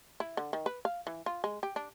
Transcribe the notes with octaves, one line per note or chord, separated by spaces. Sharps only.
E4
D3
D#3
B4
F5
E3
F4
G#3
G4
D4